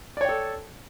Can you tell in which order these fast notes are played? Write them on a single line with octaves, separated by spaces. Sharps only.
D5 C#5 G5 A4